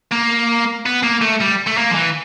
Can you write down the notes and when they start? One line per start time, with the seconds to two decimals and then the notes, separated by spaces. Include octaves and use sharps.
0.12 A#3
0.86 B3
1.03 A#3
1.21 A3
1.40 G3
1.67 A3
1.77 A#3
1.91 F3
1.95 E3